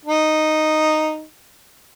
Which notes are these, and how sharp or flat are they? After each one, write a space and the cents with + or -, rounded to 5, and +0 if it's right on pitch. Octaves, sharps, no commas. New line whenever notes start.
D#4 -5